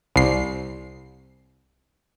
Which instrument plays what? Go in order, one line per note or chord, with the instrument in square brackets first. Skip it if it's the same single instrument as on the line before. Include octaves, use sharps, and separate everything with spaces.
[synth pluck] C2 C7